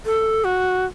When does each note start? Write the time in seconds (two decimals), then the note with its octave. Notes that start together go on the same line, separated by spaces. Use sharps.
0.06 A4
0.44 F#4